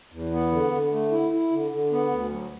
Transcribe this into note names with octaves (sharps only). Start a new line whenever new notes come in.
E2
B3
D3
D3
A3
E4
E4
D3
D3
B3
D2
F#3